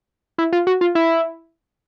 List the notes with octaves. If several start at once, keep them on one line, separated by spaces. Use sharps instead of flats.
E4
F4
F#4
F4
E4